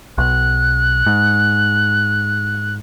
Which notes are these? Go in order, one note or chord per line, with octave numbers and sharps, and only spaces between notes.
B1 F#6
G#2